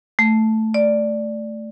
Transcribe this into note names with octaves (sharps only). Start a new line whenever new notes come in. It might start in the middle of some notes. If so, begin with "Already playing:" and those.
A3
D5